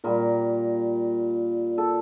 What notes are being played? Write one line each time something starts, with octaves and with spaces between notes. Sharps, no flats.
A#2 G3 A#4
A4